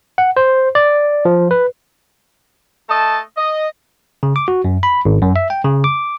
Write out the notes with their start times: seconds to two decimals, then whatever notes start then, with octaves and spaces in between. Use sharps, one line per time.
0.18 F#5
0.37 C5
0.75 D5
1.25 F3
1.51 B4
2.90 A3 D#5 A5
3.37 D#5
4.23 C#3
4.36 D6
4.48 F#4
4.64 F#2
4.83 B5
5.05 G#1
5.22 F#2
5.36 E5
5.50 G5
5.65 C#3
5.84 D6